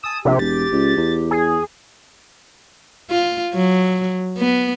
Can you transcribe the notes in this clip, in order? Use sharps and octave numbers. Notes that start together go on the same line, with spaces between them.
G#5 A5 D#6 E6
A#1 C3 G4
E1 A6
C#2
E2
G#4
F4
F#3
B3